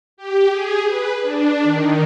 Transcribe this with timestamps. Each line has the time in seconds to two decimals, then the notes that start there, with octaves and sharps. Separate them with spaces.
0.17 G4
0.51 G#4
0.88 B4
1.21 D4
1.63 D#3